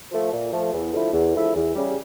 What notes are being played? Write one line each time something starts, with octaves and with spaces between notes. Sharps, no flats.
F3 A3
A#2
F3 A3
E2
D3 F3 A3 E4
E2
D3 F3 A3 E4
E2
C#3 G3